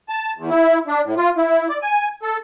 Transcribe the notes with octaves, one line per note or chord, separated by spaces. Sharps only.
A5
E2
E4
D4
A2
F4
E4
D5
G#5
A4